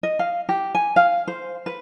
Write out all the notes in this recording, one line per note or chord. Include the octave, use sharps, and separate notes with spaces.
D#5
F5
G4
G#5
F5
C5
B4